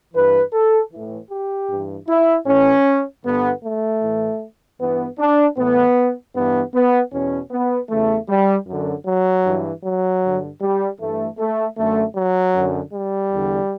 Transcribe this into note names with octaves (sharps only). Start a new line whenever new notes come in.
G2 E3 B4
A4
A2 E3
G4
G2 E3
E4
A2 E3 C#4
G2 D3 B3
A3
A2 E3
G2 E3 B3
D4
A2 E3 B3
G2 E3 B3
B3
E2 B2 C#4
B3
E2 C#3 E3 A3
G3
F#2 D3
F#3
G2 E3
F#3
G2 D3
G3
G2 E3 A3
A3
F#2 D3 A3
F#3
F#2 D3
G3
E2 D3